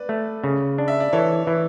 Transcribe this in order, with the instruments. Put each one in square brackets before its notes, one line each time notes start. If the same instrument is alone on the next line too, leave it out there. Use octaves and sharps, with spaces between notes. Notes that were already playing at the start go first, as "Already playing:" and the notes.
Already playing: [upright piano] B4 D5
[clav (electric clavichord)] A3
C#3
D4
[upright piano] E5
D5
[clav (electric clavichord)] E3 [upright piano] A4 C#5
[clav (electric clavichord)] E3